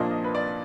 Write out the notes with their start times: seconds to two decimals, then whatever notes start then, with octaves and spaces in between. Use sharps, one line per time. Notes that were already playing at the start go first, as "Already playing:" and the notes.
Already playing: A#2 F3 A#3 D4 D#5
0.11 D#5
0.24 B4
0.35 D5